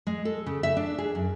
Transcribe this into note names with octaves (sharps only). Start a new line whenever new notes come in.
G#3
A4
C#3
E5
D4
G#4
F#2